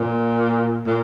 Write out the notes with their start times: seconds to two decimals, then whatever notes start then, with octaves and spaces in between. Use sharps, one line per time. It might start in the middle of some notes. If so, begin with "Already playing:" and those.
Already playing: A#2
0.87 A#2